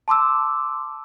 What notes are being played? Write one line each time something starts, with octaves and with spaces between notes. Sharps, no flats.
A5 C6 D6 E6